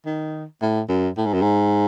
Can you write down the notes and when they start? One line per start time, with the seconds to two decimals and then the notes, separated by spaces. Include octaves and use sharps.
0.06 D#3
0.62 A2
0.89 F#2
1.18 A2
1.26 G#2
1.34 F#2
1.42 G#2